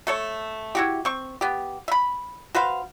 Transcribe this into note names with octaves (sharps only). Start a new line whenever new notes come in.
A3 A4 C#5
E4 F#4 G4
C4 C#6
B3 G4
E5 B5
F#4 B4 C5 F5